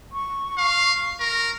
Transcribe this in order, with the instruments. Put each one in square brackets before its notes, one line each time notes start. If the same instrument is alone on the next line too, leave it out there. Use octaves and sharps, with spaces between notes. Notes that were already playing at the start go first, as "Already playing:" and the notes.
[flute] C#6
[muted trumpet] F5
A#4